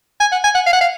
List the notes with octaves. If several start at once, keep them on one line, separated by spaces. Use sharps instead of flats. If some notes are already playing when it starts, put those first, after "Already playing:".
G#5
F#5
G#5
F#5
F5
F#5
F5